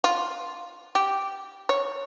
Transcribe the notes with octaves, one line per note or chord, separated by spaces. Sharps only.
F4
G4
C#5